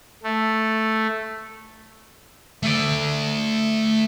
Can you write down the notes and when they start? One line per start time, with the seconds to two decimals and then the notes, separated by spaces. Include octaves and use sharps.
0.23 A3
2.63 A3 D5